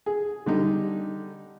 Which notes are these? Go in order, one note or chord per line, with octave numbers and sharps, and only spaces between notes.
G#4
D3 G3 D#4